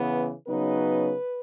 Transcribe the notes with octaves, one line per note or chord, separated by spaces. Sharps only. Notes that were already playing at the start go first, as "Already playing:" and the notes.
Already playing: C#3 E3 B3
C#3 F#3 B3 D#4 B4